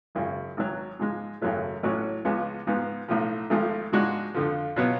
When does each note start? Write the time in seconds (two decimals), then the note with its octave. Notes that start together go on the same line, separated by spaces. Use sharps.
0.15 G#1 F#2 C#3
0.57 G#1 G#2 F#3
0.99 G#2 F3 G#3
1.41 G#1 F#2 C#3 F#3 A3
1.83 A1 A2 F#3 C#4 F#4
2.25 C#2 C#3 F3 G#3 B3
2.67 G#2 F3 B3 F4
3.08 B1 A2 F3
3.50 G#1 G#2 F3 A3
3.92 G#2 F3 G#3 D4 F#4
4.34 F2 D3 F3
4.76 B2 F#3 B3 F4